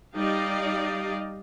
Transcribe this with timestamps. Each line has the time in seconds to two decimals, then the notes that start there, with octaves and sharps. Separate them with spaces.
0.15 G3 D#4 G4 D5 D#5 F5